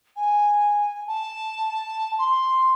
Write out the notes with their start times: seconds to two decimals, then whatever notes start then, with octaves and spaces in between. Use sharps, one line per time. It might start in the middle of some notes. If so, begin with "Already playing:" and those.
0.15 G#5
1.07 A5
2.18 C6